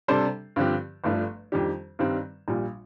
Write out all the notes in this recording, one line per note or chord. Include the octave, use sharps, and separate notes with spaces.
C3 G3 D4 A4 C5
G2 D3 F3 C4 G4
G1 G2 F3 A3 D4
F2 D#3 G3 D4 G4
G2 D#3 G3 C4
A#1 A#2 G3